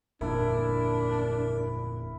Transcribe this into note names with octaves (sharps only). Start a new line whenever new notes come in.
G1 F2 A#2 D4 E4 A#4